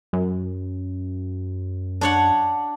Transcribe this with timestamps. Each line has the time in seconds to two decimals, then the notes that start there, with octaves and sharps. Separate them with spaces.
0.13 F#2
2.01 D4 C#5 F#5